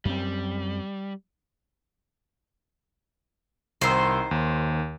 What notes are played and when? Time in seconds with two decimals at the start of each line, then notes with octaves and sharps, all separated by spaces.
0.05 F#2 G3 C4
3.81 C2 D#3 C5 E6
4.31 D#2